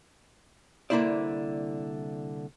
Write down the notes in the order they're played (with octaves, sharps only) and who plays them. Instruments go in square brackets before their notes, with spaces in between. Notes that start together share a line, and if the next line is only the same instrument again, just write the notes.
[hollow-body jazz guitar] C2 D3 A#3 E4 C5 D5